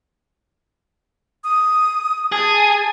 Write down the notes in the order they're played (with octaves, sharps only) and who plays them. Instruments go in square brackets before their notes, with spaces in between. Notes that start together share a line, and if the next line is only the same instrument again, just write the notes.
[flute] D#6
[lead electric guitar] G#4 [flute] A5